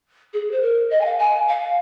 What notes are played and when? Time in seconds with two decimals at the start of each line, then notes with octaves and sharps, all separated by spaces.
0.33 G#4
0.51 C5
0.61 A#4
0.90 D#5
1.00 G#5
1.05 F5
1.18 G#5
1.48 F5